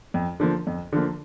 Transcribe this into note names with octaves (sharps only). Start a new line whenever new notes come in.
F2
D3 F3 A#3
F2
D3 F3 A#3